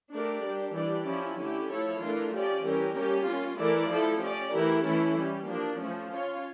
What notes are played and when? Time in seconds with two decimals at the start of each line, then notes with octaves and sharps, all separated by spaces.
0.12 A3 D4 G4 A#4 D5
0.44 G3 D4 G4
0.75 E3 G3 D4 G4 D5
1.06 F3 C#4 E4 G4
1.38 D3 A3 C#4 E4 G4
1.70 F3 A3 E4 A4 C#5
2.01 E3 A3 D4 F4 A#4
2.32 F3 C#4 G4 D5
2.64 E3 G3 C#4 G4 A#4
2.96 G3 A#3 C#4 G4
3.27 A#3 C#4 F4
3.59 E3 A3 E4 A#4 D5
3.90 F3 A3 E4 A4
4.21 C#4 G4 D5
4.53 E3 A3 E4 G4 A#4
4.85 E3 A3 C#4 E4 A4
5.16 G3 C#4 G4
5.47 F3 A#3 D4
5.79 F3 A3 C#4
6.10 C#4 F4 C#5